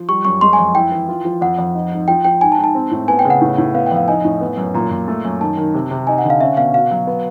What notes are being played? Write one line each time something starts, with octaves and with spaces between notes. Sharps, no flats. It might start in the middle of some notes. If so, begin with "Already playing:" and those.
Already playing: F3
G3 C#6
F#2 C#6
G#3 C6
G#5
F2
E4 G5
E3
F4
F3
F2 F#5
F2
D#4
G#2
F3 G5
F3 G5
G#2 G#5
A5
G#2
A5
C4
A2
B3 G#5
G5
C#3
F#5
A2
A2
B3 F5
F2 G5
F5
D#4 G#5
A2
B3
F#2
A#2 A#5
A#2
A3
F#2
D#3 A5
D#3
C3
C3
D#4 G#5
F#5
D3
F5
C#4 E5
B2 F5
F#4 F5
F#3
B3